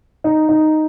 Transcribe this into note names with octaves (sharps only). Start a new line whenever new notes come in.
D#4
D#4